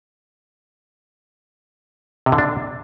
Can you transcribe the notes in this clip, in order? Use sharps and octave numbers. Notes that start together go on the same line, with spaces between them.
C3
D3
D4